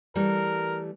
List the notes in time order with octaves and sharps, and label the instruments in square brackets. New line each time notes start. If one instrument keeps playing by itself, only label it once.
[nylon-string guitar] E3 G3 A3 [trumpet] A#4